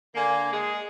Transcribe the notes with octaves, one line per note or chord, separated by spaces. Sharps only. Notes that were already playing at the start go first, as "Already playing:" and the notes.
D3 A#3 G#5
G#3 G#4